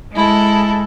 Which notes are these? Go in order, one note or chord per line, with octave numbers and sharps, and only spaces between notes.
G#3 E4 A4